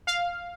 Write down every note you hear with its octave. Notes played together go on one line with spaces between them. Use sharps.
F5